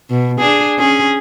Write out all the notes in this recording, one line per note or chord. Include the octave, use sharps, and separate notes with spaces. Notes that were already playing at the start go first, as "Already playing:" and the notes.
B2
D4 G#4
C#4 G#4